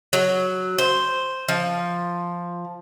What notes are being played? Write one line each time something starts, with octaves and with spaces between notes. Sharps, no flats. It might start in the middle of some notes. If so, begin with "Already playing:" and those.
F#3
C5
F3